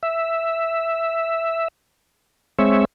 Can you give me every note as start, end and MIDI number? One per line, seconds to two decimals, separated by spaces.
0.03 1.68 76
2.59 2.85 56
2.59 2.85 60
2.59 2.85 73
2.59 2.85 76